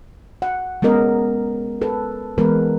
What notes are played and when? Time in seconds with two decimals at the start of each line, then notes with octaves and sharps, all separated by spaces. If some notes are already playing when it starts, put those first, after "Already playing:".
0.42 F#5
0.82 G#3 B3 C#4 A#4 D#5
1.81 A4 B4
2.38 E3 G#3 B3 A#4 B4